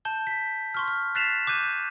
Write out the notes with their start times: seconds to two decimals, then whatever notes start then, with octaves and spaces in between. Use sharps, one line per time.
0.05 A5 G6 G7
0.27 B6
0.74 C6 C#6 F6
0.88 F6
1.15 F#6 A6 B6 C7 E7 F7
1.47 D6 F#6 G6 D#7